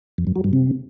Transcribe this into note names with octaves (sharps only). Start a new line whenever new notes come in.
F2
F#2
F#3
G2
C3